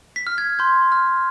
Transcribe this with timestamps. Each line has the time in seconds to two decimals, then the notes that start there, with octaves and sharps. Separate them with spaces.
0.16 B6
0.27 F6
0.38 G#6
0.59 C6 G6
0.92 F6